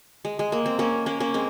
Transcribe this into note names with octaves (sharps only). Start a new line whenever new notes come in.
G#3
G#3
A#3
C4
A#3 C#4
A#3 C#4
A#3 C#4
G#3 C4